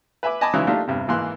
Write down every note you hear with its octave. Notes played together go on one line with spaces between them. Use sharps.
B4 E5 G#5 B5 D6
D#5 G#5 A5 B5 D6
C#3 E3 F#3 G#3 D#4 E4
A3 A#3 D4 D#4 F4 G4
E2 G2 C3
G#1 E3 A#3 C6 F#6